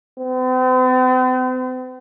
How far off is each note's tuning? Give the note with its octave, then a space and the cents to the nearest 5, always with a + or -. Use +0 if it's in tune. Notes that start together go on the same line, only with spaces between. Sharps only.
C4 -45